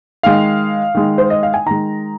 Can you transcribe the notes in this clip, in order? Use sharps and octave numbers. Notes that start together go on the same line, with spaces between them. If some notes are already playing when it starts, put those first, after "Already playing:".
D#3 G#3 F5
D#3 G#3
C5
D#5
F5
G#5
D#3 G#3 A#5